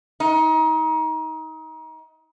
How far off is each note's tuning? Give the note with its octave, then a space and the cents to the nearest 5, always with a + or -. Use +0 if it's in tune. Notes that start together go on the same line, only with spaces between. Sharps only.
D#4 +30